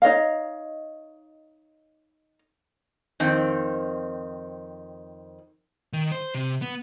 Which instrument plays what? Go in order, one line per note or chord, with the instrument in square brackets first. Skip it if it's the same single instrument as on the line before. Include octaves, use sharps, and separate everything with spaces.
[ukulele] D#4 C#5 D#5 F5
[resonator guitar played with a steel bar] F2 D#3 C4
[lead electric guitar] D#3
C5
C3
B3